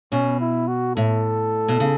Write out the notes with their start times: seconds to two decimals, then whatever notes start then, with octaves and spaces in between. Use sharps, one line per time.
0.12 B2 C#4
0.41 E4
0.68 F#4
0.96 A2 A4
1.68 B2
1.80 C#3